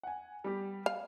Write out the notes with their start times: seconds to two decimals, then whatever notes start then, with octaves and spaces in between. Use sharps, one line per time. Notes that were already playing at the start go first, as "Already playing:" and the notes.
0.03 F#5 G#5
0.44 G3 B3 G4
0.86 F5